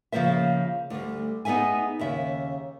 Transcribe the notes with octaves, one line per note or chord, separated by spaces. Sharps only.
C#3 F3 A#3 C5 E5
D2 G3
B3 D#4 G#4 E5 G#5
D#2 C#3 E5